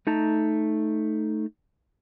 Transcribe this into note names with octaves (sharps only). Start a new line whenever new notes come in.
A3 D#4 A5 A#5